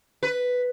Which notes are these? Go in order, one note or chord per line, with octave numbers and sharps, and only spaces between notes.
B4